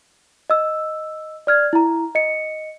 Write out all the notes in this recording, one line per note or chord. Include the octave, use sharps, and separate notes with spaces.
D#5 E6
D5 F6 G#6
E4 A#5
D#5 C#7